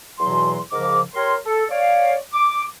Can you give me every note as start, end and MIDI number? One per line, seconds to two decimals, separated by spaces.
0.20 0.60 40
0.20 0.60 47
0.20 0.60 52
0.20 0.60 54
0.20 0.60 84
0.72 1.02 44
0.72 1.02 49
0.72 1.02 53
0.72 1.02 70
0.72 1.02 86
1.15 1.36 67
1.15 1.36 70
1.15 1.36 73
1.15 1.36 84
1.46 1.64 69
1.70 2.16 73
1.70 2.16 74
1.70 2.16 77
2.33 2.63 86